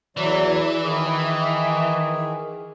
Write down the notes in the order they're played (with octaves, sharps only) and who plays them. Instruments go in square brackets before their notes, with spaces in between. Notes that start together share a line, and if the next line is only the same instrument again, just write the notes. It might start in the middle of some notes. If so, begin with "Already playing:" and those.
[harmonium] E2 F#3 D5 [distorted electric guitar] E3
[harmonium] D#3 G#4